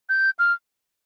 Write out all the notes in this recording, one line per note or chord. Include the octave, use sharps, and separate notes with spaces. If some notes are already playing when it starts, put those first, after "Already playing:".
G6
F6